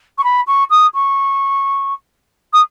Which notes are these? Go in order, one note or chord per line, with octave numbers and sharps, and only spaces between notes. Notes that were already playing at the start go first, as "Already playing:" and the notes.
C#6
B5
C#6
D#6
C#6
D#6